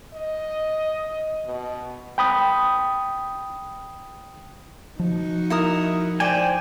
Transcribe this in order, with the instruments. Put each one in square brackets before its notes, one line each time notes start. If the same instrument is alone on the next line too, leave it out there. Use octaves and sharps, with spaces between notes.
[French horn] D#5
B2
[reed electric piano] G5 B5 D#6
[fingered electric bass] F3 [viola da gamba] D#4 F#4
[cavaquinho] E4 A#4 D#6
[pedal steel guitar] C5 G#5 [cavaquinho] D5 G5